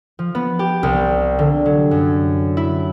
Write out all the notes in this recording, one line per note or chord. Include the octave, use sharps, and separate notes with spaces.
F3
B3
G4
C2
D3
F#3
F#2
E4